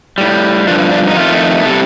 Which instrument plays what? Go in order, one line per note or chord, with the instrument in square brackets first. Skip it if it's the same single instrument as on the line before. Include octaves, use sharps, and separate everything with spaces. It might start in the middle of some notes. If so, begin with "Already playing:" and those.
[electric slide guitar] A2 G3
G2 D3 F3 D4
D4
D#4
F2 D#3 A3 F4
C3 G3 A4